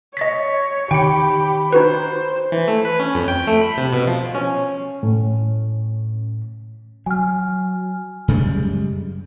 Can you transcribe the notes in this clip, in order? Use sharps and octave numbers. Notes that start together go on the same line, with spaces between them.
C#5 D#5 A6 B6
D#3 G4 G5 B5 C#7
D#4 F#4 B4 C5
E3
A3
B4
C#4
F2
G5
A3
B5
C3
B2
F3
C#4
A2
F#3 G#5 F6
F#2 C#3 G3 G#3